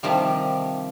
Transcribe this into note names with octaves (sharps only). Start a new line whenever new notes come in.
C3 D#3 F3 G3